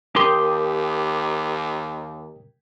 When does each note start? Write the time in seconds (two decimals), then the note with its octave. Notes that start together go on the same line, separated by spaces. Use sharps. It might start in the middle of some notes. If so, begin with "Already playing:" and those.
0.16 D#2 G4 A#4 G5 C6 D#6